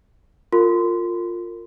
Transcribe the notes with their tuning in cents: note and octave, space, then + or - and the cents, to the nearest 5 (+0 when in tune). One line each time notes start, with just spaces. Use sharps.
F4 +10 A#4 -30 C6 -20